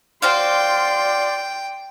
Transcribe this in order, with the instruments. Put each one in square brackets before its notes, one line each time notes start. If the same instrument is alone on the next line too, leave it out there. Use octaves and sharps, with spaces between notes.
[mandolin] F#4 C5 F5 [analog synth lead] D5 [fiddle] G5 [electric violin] C6